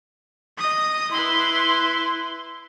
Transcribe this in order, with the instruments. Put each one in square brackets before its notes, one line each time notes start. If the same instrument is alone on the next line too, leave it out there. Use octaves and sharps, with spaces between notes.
[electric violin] D#5 D#6
[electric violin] E4 B4 [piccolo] C6